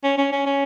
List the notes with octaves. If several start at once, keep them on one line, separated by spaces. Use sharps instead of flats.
C#4
C#4
C#4
C#4